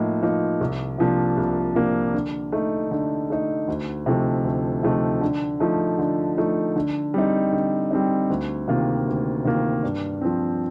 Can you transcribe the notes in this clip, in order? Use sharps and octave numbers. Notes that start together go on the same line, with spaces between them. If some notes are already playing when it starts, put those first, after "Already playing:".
Already playing: A2 F3 A#3 D#4
F3 A#3 D#4
C2
C3 F3 A#3 D4
C2
C3 F3 A#3 D4
D3
A3 D#4
D3
A3 D#4
D2
C3 F3 A3 D#4
D2
C3 F3 A3 D#4
D3
F3 A3 D#4
D3
F3 A3 D#4
D3
G3 C4 D#4
D3
G3 C4 D#4
D2
C3 D#3 A#3 F4
D2
C3 D#3 A#3 F4
G2
F3 C4